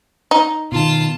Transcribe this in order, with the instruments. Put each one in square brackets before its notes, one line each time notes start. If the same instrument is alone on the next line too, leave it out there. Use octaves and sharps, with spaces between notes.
[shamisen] D#4
[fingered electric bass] B2 D#3 [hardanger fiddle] F4 A5